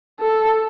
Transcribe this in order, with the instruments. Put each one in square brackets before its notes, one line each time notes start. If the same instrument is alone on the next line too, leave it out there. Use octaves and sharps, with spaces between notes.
[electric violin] A4